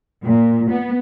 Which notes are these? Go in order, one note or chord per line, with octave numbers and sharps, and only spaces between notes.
A#2
B3